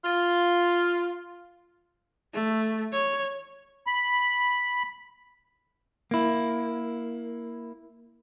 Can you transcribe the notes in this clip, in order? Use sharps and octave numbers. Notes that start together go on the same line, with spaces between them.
F4
A3
C#5
B5
A#3 E4